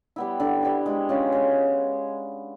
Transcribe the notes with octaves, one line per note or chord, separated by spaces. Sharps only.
G3 B3 E4
D3
G3 B3 E4
G#3
C#4 F4
G#3